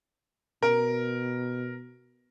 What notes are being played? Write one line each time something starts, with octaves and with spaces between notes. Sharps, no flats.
B2 A#4